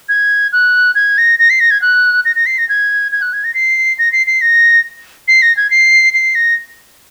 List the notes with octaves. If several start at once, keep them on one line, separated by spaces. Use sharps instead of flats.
G#6
F#6
G#6
A#6
A#6
C7
A#6
G#6
F#6
A#6
A#6
C7
A#6
G#6
G#6
F#6
G#6
A#6
C7
A#6
C7
C7
A#6
C7
A#6
G#6
C7
C7
A#6